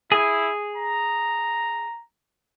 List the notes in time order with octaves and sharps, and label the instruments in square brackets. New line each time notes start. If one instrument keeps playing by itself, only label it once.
[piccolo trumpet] E4 [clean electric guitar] G#4
[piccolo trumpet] A#5